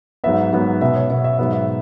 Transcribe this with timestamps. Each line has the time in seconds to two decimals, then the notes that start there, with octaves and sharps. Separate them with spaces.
0.24 G#2 F#3 B3 E5
0.52 G#2 F#3 B3
0.81 B2 B3 E5
0.95 C#5
1.10 B2 B3 E5
1.24 E5
1.39 G#2 F#3 B3 E5
1.53 E5